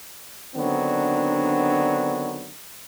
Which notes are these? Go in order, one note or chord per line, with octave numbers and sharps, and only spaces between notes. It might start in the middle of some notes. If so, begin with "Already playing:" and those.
D3 D#3 F#3 B3 C4 D4